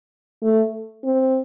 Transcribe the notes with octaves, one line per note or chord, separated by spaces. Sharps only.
A3
C4